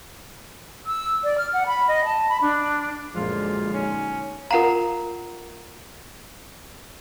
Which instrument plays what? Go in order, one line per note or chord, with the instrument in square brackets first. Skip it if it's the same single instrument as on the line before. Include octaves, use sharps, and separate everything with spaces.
[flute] E6
D5
F6
F#5
B5
D#5
A5
B5
D4
[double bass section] F#2 A#2 D3 [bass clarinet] F3 [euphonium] G#3 [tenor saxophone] F4
[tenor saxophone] C#4 [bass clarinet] D#4
[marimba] F4 F5 [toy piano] A#4 F#5 A#5